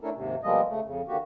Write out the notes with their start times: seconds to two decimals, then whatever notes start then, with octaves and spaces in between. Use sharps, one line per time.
0.01 A3 C#4 D4 E4 A4 A#4
0.14 D#2 G#2 C3
0.43 B2 F3 G3 G#3 A#3 D#5
0.68 C#3 A3
0.84 F2 C#3
1.08 D3 D#3 A#3 F#4 G4